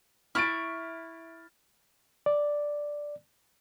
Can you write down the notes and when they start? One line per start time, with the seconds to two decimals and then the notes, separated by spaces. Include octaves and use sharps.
0.35 E4 E5 C#6 F6 A6 D7
2.26 D5